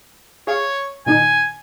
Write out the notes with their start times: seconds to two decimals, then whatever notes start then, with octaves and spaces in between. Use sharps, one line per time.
0.47 G#4 C#5 F5 C#6
1.06 A#2 D#3 D#4 G#5